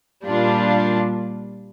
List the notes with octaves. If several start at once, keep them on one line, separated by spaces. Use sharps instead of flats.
A#2 G3 D4 F4